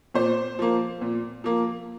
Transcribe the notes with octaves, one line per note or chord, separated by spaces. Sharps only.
A#2 C5
F3 A#3
A#2
F3 A#3